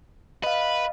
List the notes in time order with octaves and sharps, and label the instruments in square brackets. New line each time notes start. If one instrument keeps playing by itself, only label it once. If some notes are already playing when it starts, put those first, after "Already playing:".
[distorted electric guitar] B4 [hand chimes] D#5 F5